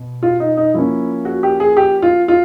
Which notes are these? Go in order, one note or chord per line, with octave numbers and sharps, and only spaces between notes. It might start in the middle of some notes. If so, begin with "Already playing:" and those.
Already playing: B2
F4
D#4
D#4
F3 A#3 C#4 E4
F#4
G4
G#4
G4
F4
F4